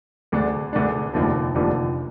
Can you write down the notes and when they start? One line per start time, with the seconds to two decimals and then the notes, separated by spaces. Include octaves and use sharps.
0.32 D2 D3 G#3 D4
0.73 D2 D3 G#3 D4
1.14 F1 D#2 D3 F3
1.55 F1 D#2 D3 F3